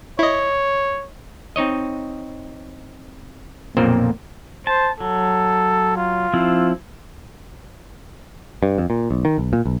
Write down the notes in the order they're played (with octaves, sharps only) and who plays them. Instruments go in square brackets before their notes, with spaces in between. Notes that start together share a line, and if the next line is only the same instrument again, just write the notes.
[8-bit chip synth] E4 D#5 [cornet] C#5
[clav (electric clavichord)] C4 D#4 C#5 D#5
B1 F2 A#2 A#3 C4 C5
[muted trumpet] C5 [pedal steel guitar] A5
[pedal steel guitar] F#3 [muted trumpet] A4
[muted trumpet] F4
[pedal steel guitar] F3 C4 E4
[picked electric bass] G2
F2
A#2
B1
D#3
B1
A#2
B1